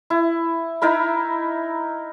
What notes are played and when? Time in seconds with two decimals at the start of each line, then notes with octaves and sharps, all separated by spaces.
0.10 E4
0.82 D#4 E4 A#4 B5